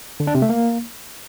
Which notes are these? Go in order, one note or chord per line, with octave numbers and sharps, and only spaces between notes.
D3
D4
C3
A3
A#3